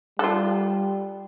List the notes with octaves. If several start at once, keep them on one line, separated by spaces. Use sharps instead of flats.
G3 F4 A4